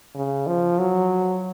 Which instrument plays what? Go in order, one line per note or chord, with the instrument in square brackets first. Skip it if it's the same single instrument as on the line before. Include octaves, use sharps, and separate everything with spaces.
[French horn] C#3
F3
F#3